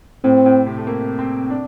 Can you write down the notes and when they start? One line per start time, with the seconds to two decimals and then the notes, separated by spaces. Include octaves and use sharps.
0.24 A2 C4
0.46 A2
0.67 C3
0.78 A3
0.87 A#3
1.19 C4
1.50 D4